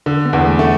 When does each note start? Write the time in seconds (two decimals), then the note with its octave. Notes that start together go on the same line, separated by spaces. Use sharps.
0.06 D3
0.26 B3
0.33 E2
0.41 B3
0.47 A3
0.59 A3